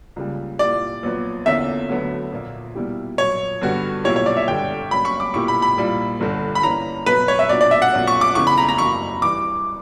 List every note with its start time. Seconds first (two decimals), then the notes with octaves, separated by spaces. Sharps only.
0.16 C#2 C#3 G3 A#3
0.59 A#2 A#3 E4 G4 D5
1.03 A#1 A#2 F#3 B3 F#4
1.46 E2 D3 A#3 C#4 E5
1.89 D2 D3 F#3 B3
2.32 A#1 A#2 A#3
2.75 B2 G3 A#3 E4 G4
3.18 A#1 A#2 F#3 C#5
3.61 G2 D3 G3 B3 F#4
4.04 B1 A#2 A#3 E4 G4 C#5
4.16 C#5
4.26 D5
4.37 E5
4.48 G1 G2 D3 G3 G5
4.91 G2 F#3 A#3 C#4 B5
5.05 C#6
5.20 D6
5.34 B1 A#2 A#3 E4 G4 C#6
5.48 B5
5.62 B5
5.77 A#1 A#2 G3 A#3 E4
6.20 G1 G2 D3
6.55 B5
6.63 G2 E3 A#3 C#4 A#5
7.06 B1 B2 F#3 B3 B4
7.28 C#5
7.39 E5
7.49 B1 A#2 A#3 D4 F#4 D5
7.61 D5
7.71 E5
7.82 F#5
7.92 B1 A#2 A#3 C#4
8.07 C#6
8.21 D6
8.35 E2 C#3 E3 C#6
8.47 B5
8.58 A#5
8.69 A#5
8.78 F#2 E3 A#3 C#6
9.22 G2 E3 G3 D6